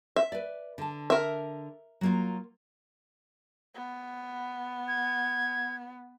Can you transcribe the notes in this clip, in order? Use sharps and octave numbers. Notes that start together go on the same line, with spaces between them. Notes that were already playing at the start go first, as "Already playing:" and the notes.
E5
B4 D5
D3 A5
A#4 E5
F#3 A#3 F4
B3
G#6